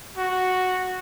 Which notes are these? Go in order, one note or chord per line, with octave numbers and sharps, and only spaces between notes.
F#4